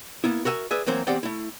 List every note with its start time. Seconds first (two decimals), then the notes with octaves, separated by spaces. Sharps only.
0.24 A#3 B3 E4
0.45 F#4 A#4 E5 G5 G#5
0.71 G#4 B4 D5 E5
0.86 E3 F#3 A#3 C4 A#4 C5
1.07 E2 C4 G4 D5 F#5 G5
1.23 A3 E4